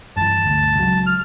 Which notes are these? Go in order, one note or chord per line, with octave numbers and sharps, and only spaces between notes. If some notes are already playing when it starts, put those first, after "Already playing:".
G2 E3 A5
G1 D2
C#2 F#3
F6